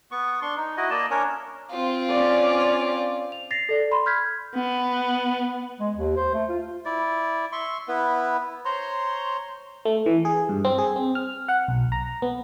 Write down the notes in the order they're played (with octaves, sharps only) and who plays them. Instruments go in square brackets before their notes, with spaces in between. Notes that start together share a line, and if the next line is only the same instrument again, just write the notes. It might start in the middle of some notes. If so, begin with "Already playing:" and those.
[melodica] B3 C#6
D4 C6 C#6
D#4
E4 F#4 D#5
A#3 D5 D#5 A5
C#4 D4 A#4 C#5
[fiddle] C4 F4
[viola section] C#4 D5
[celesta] F7
A6 A#6 C7 F7
A4 D5
B5 C6
B5 F6 G6 G#6 B6
[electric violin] B3
[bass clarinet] G#3
D#2
C5
A3
F4
[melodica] E4 D5
E5 C6 C#6
B3 E4 B4
C5 C#5 A#5 C6
[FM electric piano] A3
E3
G#4
G2
C4
G#4
C4
F6
F#5
B1
A#5
B3